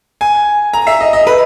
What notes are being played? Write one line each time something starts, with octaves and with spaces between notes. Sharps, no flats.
G#5
A#5
E5
D#5
D#5
B4